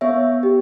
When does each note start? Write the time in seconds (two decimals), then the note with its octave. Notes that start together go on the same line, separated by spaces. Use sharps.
0.01 B3 C#5 E5
0.43 G4